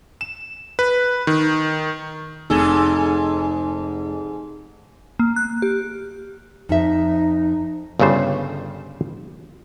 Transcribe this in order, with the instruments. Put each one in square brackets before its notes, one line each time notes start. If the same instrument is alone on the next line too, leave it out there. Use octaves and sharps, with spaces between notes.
[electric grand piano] E7
B4
D#3
[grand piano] F1 [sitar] G#2 G#4 A4 [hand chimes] D#4
[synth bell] A#3
F#6
G4
[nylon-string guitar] F2 E5 [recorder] D#4
[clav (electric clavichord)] G1 G2 C#3 G3 C5